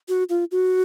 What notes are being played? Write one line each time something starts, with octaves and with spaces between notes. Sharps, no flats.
F#4
F4
F#4